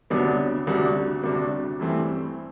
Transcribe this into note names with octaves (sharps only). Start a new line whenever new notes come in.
D2 C3 F#3 B3 D4
D2 C3 G3 D4 F#4
D2 C3 G3 D4 F#4
G2 E3 A3 C4